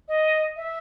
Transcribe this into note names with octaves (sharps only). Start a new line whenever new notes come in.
D#5
E5